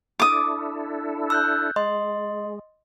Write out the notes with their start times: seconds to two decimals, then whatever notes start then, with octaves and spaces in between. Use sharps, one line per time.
0.20 D4 E4 A4 D6 D#6
1.30 E6 F#6 G6
1.76 G#3 D#5 C6